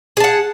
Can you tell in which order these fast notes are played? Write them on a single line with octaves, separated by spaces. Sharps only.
G#4 A5 F#5